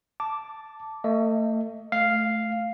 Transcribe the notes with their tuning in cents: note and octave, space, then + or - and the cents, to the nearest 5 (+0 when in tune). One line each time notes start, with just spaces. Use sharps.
A5 +0 D6 -5
A3 +35 D#5 +10
A3 -10 F5 +0